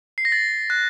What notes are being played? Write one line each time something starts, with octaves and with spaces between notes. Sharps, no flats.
C7
A#6
A6
F#6